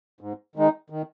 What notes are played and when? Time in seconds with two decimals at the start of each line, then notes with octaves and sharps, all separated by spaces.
0.21 G#2
0.56 D#3 G#3 D#4
0.90 D#3